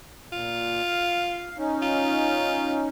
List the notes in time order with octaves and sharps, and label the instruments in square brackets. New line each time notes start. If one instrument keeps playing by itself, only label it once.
[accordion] A#2 [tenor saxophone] F4
[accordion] F5
C#4 D#4
[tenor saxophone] F4